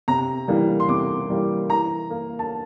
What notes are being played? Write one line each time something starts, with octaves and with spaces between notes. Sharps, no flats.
C3 A#5
E3 G3 A#3
C6
C3 D6
E3 G3 A#3
E3 A#5
A#3
A5